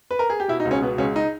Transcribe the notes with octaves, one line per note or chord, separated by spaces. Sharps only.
B4
A#4
G#4
G4
B2 E4
D#4
C#2
C#4
B2 B3
C#2 C#4
D#4